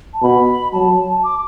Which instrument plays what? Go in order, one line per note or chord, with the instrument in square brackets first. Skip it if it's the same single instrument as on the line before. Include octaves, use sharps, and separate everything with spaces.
[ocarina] A5
[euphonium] B2 [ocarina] B5
[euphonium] F#3 [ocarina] A5
[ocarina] D6